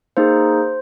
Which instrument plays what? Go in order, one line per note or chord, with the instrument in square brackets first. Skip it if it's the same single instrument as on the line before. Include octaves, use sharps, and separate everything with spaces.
[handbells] A#3 D#4 G#4 C5